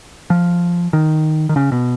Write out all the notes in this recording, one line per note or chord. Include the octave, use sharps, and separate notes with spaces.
F3
D#3
D#3
C#3
B2